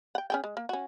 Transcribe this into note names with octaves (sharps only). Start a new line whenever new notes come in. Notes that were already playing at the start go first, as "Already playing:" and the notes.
F#5 G5
C#4 G#4 G5
G#3
A#3
C#4 F#4